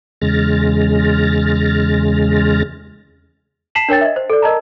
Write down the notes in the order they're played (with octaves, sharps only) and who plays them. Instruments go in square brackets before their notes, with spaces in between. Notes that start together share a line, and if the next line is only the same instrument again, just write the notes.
[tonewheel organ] E2 C#3 G#3 F6 A6 A#6
[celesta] A5 B6 C7 E7 F#7
D4 A#4 C#5 G5 A6
D#5 E5
C5
A4 D5
A#4 D#5 A5 A#5